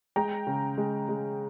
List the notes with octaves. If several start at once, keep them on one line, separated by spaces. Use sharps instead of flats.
G#3 G5 A#5
C#3
G#3
G#3